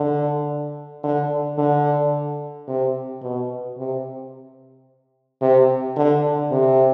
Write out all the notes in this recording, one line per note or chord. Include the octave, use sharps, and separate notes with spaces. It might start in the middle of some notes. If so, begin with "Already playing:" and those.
Already playing: D3
D3
D3
C3
B2
C3
C3
D3
C3